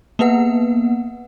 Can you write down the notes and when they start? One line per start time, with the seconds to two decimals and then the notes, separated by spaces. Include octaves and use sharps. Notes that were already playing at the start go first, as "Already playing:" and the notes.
0.19 A#3 B3 B4 F#5